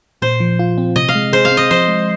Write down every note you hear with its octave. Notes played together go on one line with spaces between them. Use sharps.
A#2 C5
F3
F4
C4
C3 D#5
F5
G#3
G#4 C5
F5
C4
D#5
F3 C5
G#3